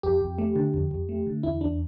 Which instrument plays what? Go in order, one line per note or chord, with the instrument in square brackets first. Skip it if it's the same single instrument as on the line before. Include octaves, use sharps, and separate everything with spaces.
[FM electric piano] F2 G4
F2
A3
D3
F2
F2
A3
D3
E2 E4
E2 D4